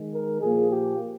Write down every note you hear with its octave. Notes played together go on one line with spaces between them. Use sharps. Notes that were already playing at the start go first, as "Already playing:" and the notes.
Already playing: D#3 G#3
A#4
A#2 F3 A#3 G#4
G4